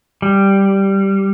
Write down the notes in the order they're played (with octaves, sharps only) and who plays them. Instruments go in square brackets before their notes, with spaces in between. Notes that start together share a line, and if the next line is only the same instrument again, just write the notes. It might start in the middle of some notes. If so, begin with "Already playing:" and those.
[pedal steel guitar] G3